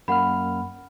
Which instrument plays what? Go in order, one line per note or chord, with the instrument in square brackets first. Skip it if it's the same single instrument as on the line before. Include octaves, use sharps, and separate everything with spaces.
[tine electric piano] F#2 A#3 F6 [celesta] F#5 B5